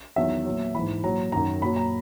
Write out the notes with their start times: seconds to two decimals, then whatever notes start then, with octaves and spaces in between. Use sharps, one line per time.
0.16 E2 D#3 F#3 E5
0.45 A#2 F#3
0.75 G#2 E3 B5
1.03 A#2 F#3 A#5
1.32 F#2 D#3 F#3 A#5
1.61 A#2 F#3 B5
1.76 A#5